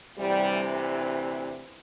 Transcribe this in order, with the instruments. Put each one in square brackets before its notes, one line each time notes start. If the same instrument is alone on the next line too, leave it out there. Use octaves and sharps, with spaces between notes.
[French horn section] D2 C3 E3 G3